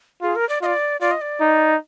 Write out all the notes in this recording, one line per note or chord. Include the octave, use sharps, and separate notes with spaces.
F4 G#4
A#4
D5
F4 D5 D#5
F4 D5
D#5
D5
D#4